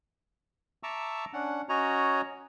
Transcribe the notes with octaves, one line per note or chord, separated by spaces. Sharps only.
E5 A5 A#5 C#6 D6 E6
C#4 D4 F#5
C#4 F#4 C#5 D#5 A#5